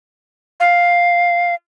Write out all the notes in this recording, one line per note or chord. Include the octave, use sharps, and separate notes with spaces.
F5